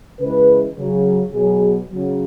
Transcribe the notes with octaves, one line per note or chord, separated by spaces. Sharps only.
C#3 E3 G#3 B4
C#3 F#3
B2 F#3 G#4
C#3 F#3